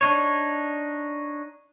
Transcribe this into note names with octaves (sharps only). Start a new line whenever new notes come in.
D4 D#4 C#5